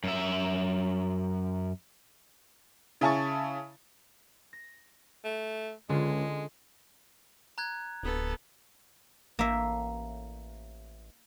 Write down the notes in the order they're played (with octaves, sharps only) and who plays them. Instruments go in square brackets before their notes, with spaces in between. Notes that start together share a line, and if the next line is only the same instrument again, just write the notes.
[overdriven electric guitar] F#2 E5
[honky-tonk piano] C#3 E4 G#5 A5 C#6 A6
[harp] A#6
[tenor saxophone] A3
[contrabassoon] C#2 [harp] D3 C#4 F4 [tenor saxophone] G#3
[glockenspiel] A#5 F#6 G#6
[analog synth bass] D1 [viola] B3 A4
[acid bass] A1 [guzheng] A#3 E5